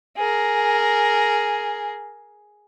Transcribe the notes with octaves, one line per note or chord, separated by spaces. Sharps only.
G#4 A#4